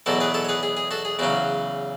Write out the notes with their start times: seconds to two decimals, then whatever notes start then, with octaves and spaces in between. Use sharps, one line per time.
0.06 E2 B2 F#3 F#4 A4
0.21 G#4 B4
0.34 A4 C#5
0.45 C#5
0.49 G#4 B4
0.63 G#4
0.77 G#4
0.91 F#4 A4
1.05 G#4
1.19 E2 C#3 F#3 C#4 F#4